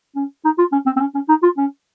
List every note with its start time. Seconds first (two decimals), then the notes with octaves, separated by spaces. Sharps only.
0.16 C#4
0.45 D#4
0.58 F4
0.72 C#4
0.86 C4
0.96 C4
1.00 C#4
1.15 C#4
1.29 D#4
1.43 F4
1.57 C#4